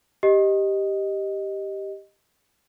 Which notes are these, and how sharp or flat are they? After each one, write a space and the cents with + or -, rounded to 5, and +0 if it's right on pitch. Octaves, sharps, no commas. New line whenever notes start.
G4 +0 D#5 +0